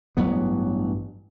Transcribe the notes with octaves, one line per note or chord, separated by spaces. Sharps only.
A1 G2 F#3 B3